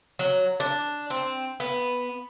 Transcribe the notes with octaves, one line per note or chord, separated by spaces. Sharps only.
F#3
D4
C4
B3